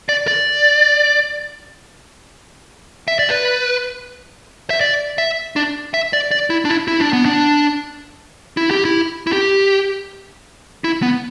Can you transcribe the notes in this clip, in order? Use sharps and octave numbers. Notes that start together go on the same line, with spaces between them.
D5
D5
E5
D5
B4
E5
D5
E5
D4
E5
D5
D5
E4
D4
E4
E4
D4
B3
D4
E4
G4
E4
E4
G4
E4
B3